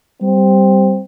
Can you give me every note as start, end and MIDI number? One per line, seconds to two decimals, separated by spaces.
0.22 1.00 55
0.22 1.02 60